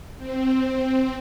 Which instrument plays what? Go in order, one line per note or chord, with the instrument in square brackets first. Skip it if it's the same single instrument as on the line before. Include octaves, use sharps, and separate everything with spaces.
[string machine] C4